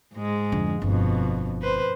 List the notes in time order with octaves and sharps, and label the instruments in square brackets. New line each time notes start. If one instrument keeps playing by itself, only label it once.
[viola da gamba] G#2 G#3
[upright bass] F2 D3
[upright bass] G1 [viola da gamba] F2 B2
[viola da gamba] B4 C5